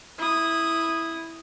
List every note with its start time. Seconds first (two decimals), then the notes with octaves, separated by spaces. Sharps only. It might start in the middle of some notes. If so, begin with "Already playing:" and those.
0.18 E4 D#6